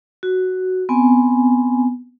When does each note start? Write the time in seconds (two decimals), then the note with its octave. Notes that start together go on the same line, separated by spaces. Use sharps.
0.23 F#4
0.89 B3 C4 G#5